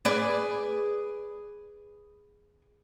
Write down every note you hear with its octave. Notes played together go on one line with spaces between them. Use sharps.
G#4 B4 D5